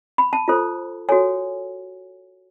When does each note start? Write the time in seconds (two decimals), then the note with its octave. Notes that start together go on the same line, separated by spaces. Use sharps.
0.18 B5
0.33 A5
0.48 F4 A4 C5
1.09 F#4 A4 C#5 G#5